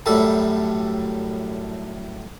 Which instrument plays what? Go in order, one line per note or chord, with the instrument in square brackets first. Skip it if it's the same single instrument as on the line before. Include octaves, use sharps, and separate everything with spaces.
[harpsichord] F#2 A2 G3 A4